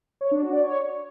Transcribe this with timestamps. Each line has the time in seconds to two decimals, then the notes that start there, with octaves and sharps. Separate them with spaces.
0.21 C#5
0.31 D4
0.42 F#4
0.53 D5
0.63 C#5